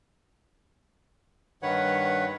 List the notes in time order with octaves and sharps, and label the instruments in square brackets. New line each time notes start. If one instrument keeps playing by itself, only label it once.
[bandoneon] G2 D#3 B4 C#5 F#5